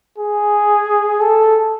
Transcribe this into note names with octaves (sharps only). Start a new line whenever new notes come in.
G#4
A4